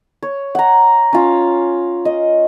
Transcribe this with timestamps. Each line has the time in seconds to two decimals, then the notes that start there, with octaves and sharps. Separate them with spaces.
0.23 C#5
0.55 F#5 A#5
1.13 C#4 F4
2.05 D#5